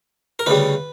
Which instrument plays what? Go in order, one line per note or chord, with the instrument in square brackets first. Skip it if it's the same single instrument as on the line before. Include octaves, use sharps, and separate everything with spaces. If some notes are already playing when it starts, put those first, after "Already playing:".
[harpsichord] A#4
D2 C#3 G3 B4